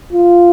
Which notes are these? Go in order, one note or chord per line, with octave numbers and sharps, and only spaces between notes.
F4